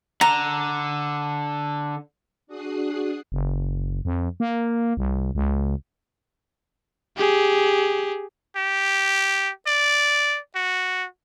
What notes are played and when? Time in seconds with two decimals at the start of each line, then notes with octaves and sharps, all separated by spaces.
0.21 D3 A#5
2.47 D4 F#4 G#4 D#6 F#6 C7
3.32 F#1
4.05 F2
4.40 A#3
4.97 C2
5.35 C#2
7.17 G4 G#4
8.56 G4
9.67 D5
10.55 F#4